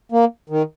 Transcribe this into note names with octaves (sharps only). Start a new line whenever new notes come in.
A#3
D#3